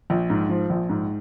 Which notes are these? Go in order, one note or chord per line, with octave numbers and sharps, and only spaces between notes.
A#1
G#2
F3
A#1
G#2